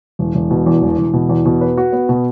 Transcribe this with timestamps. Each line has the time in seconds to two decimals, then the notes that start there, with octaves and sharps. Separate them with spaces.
0.19 E1
0.35 E1
0.51 B2
0.66 E2
0.82 E1
0.98 E1
1.13 B2
1.29 E2
1.46 B2
1.61 B4
1.77 F#4
1.92 B3
2.09 B2